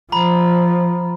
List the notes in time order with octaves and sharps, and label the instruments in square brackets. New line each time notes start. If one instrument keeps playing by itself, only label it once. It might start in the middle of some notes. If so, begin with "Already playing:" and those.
[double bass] F3 [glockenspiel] A#5 B5